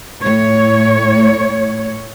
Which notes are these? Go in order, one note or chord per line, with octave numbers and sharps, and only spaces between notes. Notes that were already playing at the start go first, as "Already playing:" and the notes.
A2 C#5